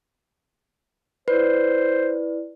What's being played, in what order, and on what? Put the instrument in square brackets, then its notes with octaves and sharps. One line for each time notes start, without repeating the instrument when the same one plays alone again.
[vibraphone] E4 D5 [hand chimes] B4 [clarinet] C5